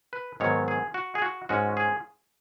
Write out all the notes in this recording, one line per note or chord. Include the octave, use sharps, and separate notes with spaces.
B4
G#2 D#3 F#3 B3 C#5
G#4
F#4
G#4
F#4
G#2 G#3 C#4 F#4
G#4